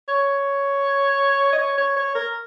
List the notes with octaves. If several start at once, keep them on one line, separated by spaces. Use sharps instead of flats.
C#5
D#5
C#5
C#5
C#5
A#4